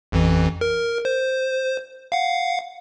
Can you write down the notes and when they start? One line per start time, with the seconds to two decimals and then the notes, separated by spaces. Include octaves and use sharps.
0.12 A1 F2 E3
0.61 A#4
1.05 C5
2.12 F5 F#5